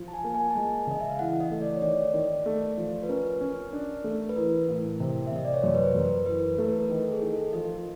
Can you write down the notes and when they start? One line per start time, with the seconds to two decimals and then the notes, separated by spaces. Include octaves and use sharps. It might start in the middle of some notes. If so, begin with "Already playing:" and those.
Already playing: F3
0.08 A5
0.13 G#5
0.24 A#3
0.35 G#5
0.50 A5
0.55 G#3 G#5
0.87 C#3 D#5
1.00 E5
1.10 F5
1.19 E3 F#5
1.40 D#5
1.51 A3
1.61 D5
1.76 C#5
1.82 D#3 D5
2.14 D#3
2.46 A3
2.78 F3
3.03 B4
3.09 C#4 A#4
3.41 C#4
3.73 D4
4.04 A3
4.29 B4
4.36 E3 A#4
4.68 A2
5.00 C3
5.27 E5
5.32 C3 D#5
5.45 D5
5.54 C#5
5.63 F#2 C5
5.75 B4
5.84 C5
5.95 F#2 A#4
6.05 B4
6.26 E3 B4
6.58 A3 A#4
6.69 B4
6.78 A#4
6.90 D#3 A4
7.11 G#4
7.22 D#3
7.32 A4
7.53 F3 D#5